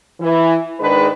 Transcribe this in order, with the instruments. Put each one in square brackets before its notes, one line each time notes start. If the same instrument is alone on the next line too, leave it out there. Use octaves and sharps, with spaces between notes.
[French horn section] E3
G#2 D#3 G#3 D4 B4